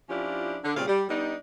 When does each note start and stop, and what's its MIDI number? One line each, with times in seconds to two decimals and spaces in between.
0.10 0.57 53
0.10 0.57 61
0.10 0.57 62
0.10 0.57 64
0.10 0.57 65
0.10 0.57 67
0.64 0.75 50
0.76 0.84 46
0.76 0.84 49
0.76 0.84 55
0.76 0.84 60
0.76 0.84 61
0.76 0.84 77
0.88 1.03 55
1.09 1.35 55
1.09 1.35 59
1.09 1.35 62
1.09 1.35 63